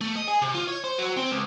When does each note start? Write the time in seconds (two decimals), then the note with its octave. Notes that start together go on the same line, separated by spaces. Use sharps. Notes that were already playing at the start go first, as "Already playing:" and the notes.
0.01 A3
0.15 D#5
0.27 G#4
0.42 C3
0.54 F4
0.68 C#5
0.84 C5
0.99 F#3
1.17 C4
1.31 C#2